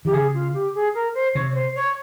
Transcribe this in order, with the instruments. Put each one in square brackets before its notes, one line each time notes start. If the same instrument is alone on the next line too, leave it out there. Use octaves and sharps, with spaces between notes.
[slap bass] E3 [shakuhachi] G4
[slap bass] C#3 [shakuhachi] G#4
[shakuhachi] F4
G4
G#4
A#4
C5
[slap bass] C3 [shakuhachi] C#5
[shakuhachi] C#5
C5
C#5